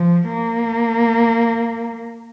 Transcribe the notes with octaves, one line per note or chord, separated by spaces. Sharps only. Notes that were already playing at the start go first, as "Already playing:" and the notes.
Already playing: F3
A#3